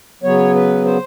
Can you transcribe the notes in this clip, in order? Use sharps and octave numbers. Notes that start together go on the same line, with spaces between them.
C#3 F#3 B3 C#5
B4
C5